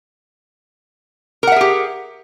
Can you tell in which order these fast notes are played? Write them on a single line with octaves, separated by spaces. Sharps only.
A#4 F#5 E5 G#4 G4